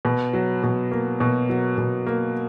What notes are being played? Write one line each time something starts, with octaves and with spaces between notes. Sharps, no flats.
B2
F#3
B2
A#3
B2
F#3
B2
A#3